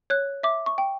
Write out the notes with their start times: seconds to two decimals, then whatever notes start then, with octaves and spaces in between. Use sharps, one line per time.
0.10 C#5 F#6
0.43 E5 D6
0.66 C#6
0.78 G5